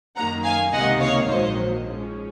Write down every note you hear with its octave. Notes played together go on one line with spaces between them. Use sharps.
F#2 D#3 A#3 F#5 A#5
F5 G#5
C#2 C3 D#3 A#3 D#4 D#5 F#5
C#5 F5
A#1 G#2 D#3 F#3 A#3 C5 D#5
G#2 F3 G#3 C#4